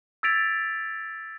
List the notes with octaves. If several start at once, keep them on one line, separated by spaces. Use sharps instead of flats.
E6 G#6 A6 B6 D7 F7